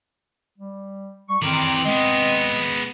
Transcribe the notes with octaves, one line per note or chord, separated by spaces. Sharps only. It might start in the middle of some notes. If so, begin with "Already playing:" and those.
G3
G3 C#6
F2 D#3 E3 C4 D5 A#5
G#3 B3 D#5